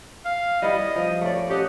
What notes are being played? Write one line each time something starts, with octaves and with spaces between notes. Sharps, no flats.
F5
G3 B3 E4 D#5
F3
A3 C#4 D5
C#4 G4 D#5 F#5